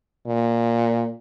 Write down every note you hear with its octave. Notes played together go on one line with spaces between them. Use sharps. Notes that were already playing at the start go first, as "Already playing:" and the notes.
A#2